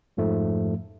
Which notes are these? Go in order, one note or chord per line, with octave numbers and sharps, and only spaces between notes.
F2 G#2 F3 A3